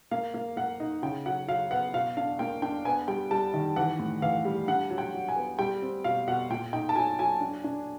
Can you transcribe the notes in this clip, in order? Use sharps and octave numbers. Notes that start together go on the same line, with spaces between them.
A#3 F5
A#3
A#3 F#5
D#4
C#3 G5
F#3 F#5
F#3 F5
B3 F#5
B2 F5
D4 F5
A#3 G5
D4 G5
B3 G#5
G3 G5
G3 A5
D#3
E3 F#5
A2
E3 F5
G3
D4 F#5
F#3
G5
F#3
G#5
B3
G3 G5
C4
B2 F5
B2 F#5
A#2 G5
D#4 G5
A5
F#3 G#5
F#3 G#5
D4
D4